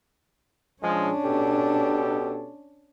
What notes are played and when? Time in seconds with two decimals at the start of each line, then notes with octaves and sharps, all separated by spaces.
0.82 F3 G#3 C#4 D4
1.25 B2 G4 A4